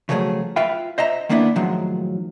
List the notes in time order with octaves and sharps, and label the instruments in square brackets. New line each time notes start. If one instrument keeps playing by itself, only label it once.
[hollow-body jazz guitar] C#3 F3 F#3 A3 G#4
F4 B4 E5 F5 G5 B5
C5 D#5 E5 A#5
D#3 A#3 B3 D4 E4
A2 D#3 F3 F#3 G#3